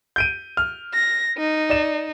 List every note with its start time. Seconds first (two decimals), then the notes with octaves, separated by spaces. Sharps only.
0.16 G6 D7 D#7
0.57 F6
0.94 A#6
1.38 D#4
1.70 D5 E7